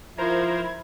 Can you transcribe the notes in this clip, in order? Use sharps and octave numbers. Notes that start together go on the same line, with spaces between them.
F3 E4 A#4 C5 A#5 G#6